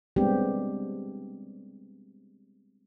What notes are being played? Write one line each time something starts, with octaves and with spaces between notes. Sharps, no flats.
G3 G#3 B3 C4 D4 G4